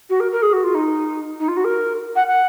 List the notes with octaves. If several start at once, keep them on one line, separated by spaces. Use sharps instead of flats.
F#4
A#4
A#4
G#4
F#4
F4
D#4
D#4
F4
F#4
A#4
F#5
F#5